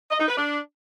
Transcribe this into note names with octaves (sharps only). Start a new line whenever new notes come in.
D#5
D#4
B4
D4